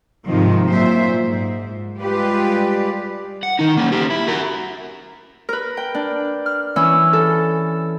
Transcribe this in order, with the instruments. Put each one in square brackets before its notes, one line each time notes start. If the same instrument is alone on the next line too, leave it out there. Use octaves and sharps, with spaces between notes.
[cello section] G#2 C3 D#3 F3
A#2 F#3 C5 E5
G#2
G3 G#3 F4 G4 B4 D5
[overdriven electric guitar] F#5
D#3 D#4
A#3 C#4
C#4 G4
E4
F#4 A#4
[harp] A#4 B4
G5
D4
F6
E3 C#4 E6
A4